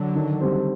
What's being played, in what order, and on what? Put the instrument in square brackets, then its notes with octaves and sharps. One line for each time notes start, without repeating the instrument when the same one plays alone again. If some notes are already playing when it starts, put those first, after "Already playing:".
Already playing: [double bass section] D3 F#3
[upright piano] D#3
G3 C4